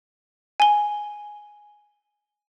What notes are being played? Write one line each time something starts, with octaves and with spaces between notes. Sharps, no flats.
G#5 G7